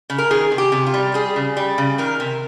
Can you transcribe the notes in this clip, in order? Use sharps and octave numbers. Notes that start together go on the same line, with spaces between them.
C#3
A#4
D#3 G#4
C3
G4
C3
F4
G3
G3 G#4
C#3
G3
C#3
D#3 A#4
C3